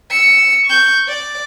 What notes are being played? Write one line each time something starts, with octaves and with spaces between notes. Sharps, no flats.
E6 C#7
C#6 G6
D5